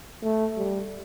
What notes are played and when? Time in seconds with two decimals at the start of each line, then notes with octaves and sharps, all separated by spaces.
0.22 A3
0.57 G3